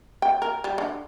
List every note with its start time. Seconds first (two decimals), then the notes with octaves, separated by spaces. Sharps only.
0.22 G5
0.42 A#4
0.64 G3
0.78 D3